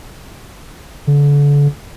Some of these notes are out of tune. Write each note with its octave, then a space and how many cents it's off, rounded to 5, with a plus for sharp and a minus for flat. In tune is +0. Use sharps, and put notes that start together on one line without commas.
D3 -35